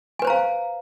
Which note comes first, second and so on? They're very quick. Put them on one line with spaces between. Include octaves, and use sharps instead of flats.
G#5 B4 C5 A#5 F5